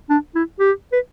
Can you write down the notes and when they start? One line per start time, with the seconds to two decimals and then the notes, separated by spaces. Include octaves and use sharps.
0.10 D4
0.35 E4
0.60 G4
0.93 B4